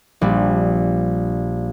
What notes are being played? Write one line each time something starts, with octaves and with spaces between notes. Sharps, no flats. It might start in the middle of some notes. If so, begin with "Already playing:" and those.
A#1 G3